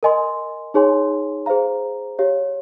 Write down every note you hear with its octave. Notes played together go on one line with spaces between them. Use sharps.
A#4 D#5 G#5 C6
D#4 G#4 C#5 G#5 C6
G#4 C5 F5 A#5
G4 C#5 F5